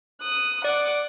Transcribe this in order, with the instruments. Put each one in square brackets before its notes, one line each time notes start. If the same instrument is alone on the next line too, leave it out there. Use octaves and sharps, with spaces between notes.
[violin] D#6 F#6
[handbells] D5 [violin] F#5 D6